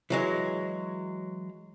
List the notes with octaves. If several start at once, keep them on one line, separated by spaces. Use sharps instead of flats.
E3 F#3 G#3